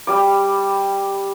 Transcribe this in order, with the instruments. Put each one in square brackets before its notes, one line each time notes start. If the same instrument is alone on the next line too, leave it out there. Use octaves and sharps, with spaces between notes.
[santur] G3 D6